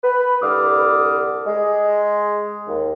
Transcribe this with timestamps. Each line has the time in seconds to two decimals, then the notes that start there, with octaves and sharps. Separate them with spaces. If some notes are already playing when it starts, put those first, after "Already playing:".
0.03 B4
0.42 C2 D3 G3 D6 D#6 F6
1.46 G#3
2.68 D#2